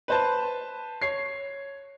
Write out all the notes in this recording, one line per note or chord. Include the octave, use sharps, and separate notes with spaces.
B4 C5 A5
C#5 C7